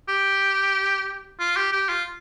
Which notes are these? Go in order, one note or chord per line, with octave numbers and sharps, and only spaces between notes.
G4
F4
G4
G4
F4